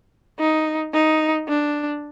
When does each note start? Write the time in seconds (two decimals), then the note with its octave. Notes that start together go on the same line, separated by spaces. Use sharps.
0.39 D#4
0.93 D#4
1.48 D4